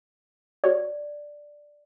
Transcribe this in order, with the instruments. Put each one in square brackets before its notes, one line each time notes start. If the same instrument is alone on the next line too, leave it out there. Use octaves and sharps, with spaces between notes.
[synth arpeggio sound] F#4 C#5 [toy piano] D5